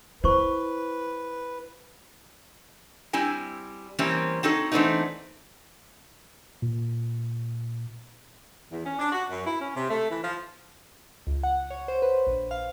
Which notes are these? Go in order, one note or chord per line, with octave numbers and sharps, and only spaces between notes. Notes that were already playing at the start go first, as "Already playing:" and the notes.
E4 B4 C5 C#6
G3 C4 E4 G#5
E3 G3 A#3 C4 C#4
C4 D#4 F#4 A4 C#5
E3 A3 B3 C4 D4 D#4
A#2
E2
C#4
D4
F#4
F#2
E4
C#4
C3
A3
E3
F3
C#2
F#5
C#5
C5
B4
A#1
F5